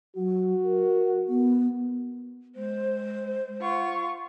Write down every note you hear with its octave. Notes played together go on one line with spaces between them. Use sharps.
F#3 F#4
A#4
B3
G#3 C5
F4 F#5 C#6